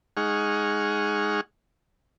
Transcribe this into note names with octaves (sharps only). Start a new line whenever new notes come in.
G#3 D#4 G#4 F#5 C#6 F6